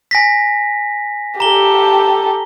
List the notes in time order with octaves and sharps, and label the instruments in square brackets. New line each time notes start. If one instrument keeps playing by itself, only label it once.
[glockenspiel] G#5 A#6 B6
[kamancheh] G4 A4 [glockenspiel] A#5 G7